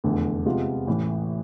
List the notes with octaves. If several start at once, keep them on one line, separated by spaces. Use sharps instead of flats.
F1 E2 D3
C3 G#3 B3 F4
A1 A2 E3